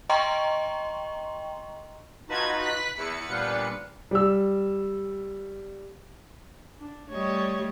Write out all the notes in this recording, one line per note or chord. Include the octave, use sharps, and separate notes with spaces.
D#5 G5 A#5 C6 C#6
D#4 F4 F#4 B4 A5 G#6
F#6 B6
E2 E4 B4 C#7
A#2 F3 G3 B3 D4 F4
G3 E6
D4
G3 A3 C#5 D#5